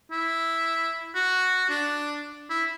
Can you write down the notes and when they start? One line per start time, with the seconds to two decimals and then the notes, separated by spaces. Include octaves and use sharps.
0.12 E4
1.15 F#4
1.70 D4
2.50 E4